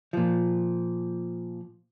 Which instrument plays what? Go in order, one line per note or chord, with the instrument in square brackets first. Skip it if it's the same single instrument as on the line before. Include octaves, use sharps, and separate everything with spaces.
[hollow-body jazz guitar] A#2 F3